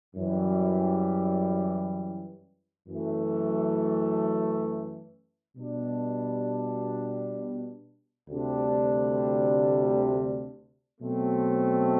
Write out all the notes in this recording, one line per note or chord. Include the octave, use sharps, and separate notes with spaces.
F#2 E3 G3
F#2 E3 A3
B2 G3 D4
D2 C3 G3 D4
B2 F#3 A3 C4